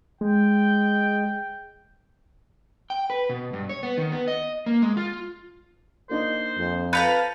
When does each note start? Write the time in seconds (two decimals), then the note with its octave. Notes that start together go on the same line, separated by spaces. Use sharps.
0.21 G#3 G5
2.90 G5
3.10 B4
3.29 B2
3.53 G2
3.69 C#5
3.83 B3
3.97 D#3
4.12 B3
4.27 D#5
4.66 A#3
4.82 G#3
4.97 F4
6.09 A#3 D4 D#4 C5
6.57 F2
6.93 B4 F5 A5 A#5 F#6 G6 C#7